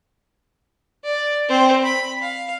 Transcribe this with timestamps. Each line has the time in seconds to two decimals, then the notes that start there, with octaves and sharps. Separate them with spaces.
1.04 D5
1.49 C4 C5
1.83 B5
2.21 F5